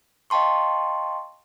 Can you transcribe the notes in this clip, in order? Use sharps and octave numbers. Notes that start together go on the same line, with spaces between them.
D#5 F5 G5 A5 C6 C#6